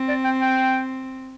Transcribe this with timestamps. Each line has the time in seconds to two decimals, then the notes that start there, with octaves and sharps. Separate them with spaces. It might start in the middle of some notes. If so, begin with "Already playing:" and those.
Already playing: C4
0.08 D5
0.25 G5
0.41 G5